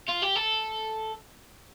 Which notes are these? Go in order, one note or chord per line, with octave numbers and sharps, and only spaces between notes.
F4
G4
A4